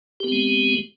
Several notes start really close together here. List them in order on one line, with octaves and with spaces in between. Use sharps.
G4 B3 C4 G#3